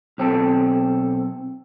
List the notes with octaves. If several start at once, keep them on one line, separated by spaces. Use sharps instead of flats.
B1 C4 A4